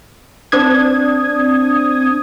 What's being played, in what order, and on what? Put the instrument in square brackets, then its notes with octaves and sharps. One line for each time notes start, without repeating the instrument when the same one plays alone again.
[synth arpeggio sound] C4 D4 D#6 G#6